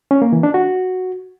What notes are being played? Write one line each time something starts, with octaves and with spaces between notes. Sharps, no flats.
C#4
A#3
E3
D4
F#4